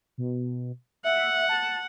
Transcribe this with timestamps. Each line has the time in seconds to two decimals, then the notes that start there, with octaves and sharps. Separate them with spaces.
0.18 B2
1.04 E5 F#5
1.49 A5